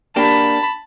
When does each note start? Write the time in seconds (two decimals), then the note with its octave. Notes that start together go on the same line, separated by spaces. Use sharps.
0.16 A#3 D4 G4 A5 B5